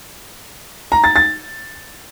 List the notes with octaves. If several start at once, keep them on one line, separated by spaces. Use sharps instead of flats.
A#5
A6
A6